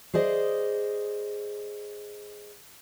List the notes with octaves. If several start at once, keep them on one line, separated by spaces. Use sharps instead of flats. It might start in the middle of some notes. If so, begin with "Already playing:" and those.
G#4 C5 D5 D#5